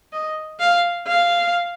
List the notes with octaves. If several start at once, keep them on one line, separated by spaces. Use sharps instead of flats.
D#5
F5
F5